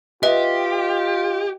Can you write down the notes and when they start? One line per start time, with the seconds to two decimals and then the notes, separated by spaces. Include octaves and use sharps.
0.23 F4 G4 B4 D#5 E5